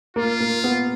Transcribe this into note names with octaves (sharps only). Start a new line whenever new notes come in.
A#3 F4
A#3
B3